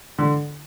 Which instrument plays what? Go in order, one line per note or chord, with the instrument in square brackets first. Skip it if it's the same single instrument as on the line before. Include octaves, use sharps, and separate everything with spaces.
[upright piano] D3